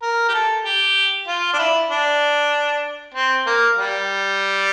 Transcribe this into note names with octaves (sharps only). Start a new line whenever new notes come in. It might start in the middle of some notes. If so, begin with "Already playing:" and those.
A#4
G4
A4
G4
F4
D4
E4
D4
C4
A#3
G3